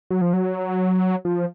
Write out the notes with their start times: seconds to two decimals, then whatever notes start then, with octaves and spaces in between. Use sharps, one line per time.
0.11 F#3
0.21 F3
0.33 F#3
1.25 F3